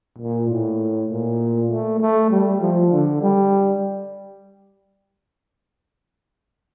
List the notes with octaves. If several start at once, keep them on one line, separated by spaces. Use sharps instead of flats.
A#2
A2
A#2
A3
A3
G3
F3
D3
G3